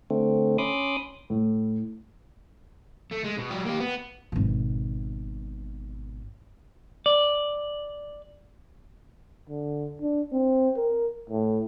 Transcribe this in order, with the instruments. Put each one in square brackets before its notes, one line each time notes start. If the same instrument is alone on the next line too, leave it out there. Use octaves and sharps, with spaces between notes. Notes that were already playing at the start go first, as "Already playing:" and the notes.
[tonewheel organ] D3 A3 C4
C#4 B5 C6 D6 D#6
[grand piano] A2
[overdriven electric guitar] A3
G#3
B2
F#3 G4
A#3 G4
B3
[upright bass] G#1 B2
[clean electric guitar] D5
[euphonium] D3
D4
C4
A#4
A2